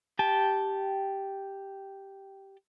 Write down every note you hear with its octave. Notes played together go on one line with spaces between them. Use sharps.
G4 G5 A5